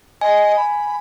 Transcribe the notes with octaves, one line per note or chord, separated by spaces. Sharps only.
D#5 G#5
B5